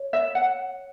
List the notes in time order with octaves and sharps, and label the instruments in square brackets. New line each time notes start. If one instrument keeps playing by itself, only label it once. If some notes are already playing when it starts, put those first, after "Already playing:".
Already playing: [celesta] C#5
[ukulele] E5
F#5